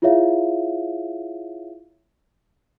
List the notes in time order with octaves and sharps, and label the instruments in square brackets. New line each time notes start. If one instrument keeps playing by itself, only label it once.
[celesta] E4 F4 G#4 C#5 E5 F5